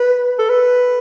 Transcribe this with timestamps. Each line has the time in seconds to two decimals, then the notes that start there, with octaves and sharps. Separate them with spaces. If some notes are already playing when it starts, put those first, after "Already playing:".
Already playing: B4
0.39 A4
0.49 B4